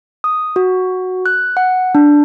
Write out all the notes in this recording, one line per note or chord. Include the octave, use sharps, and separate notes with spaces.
D#6
F#4
F#6
F#5
D4